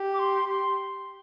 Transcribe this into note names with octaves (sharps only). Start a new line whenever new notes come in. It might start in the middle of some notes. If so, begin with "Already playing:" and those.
Already playing: G4
D6
C6
C6